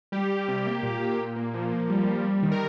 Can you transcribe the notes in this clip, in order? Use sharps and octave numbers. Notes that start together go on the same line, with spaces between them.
G3 G4
G3
C3
A#3
A#2
A#2
A#2
A#3
F3
A#3
G3
G3
G3
D#3
A#4